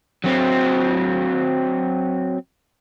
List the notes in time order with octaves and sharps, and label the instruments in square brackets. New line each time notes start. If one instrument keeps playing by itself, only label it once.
[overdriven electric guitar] F#3 C4